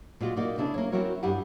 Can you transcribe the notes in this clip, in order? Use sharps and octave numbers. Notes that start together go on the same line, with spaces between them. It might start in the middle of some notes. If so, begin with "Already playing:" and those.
A#2 G#3 F4 F#4
A#3 D#4 F#4 D5
C#3 D4 E4 G#4 A4
A#3 C#5
C4 C#4 E4 F#4 A#4 C#5
G2 E4 G4 G#4 F#5